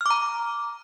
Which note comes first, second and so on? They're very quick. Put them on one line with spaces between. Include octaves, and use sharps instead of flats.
F6 D6 A#5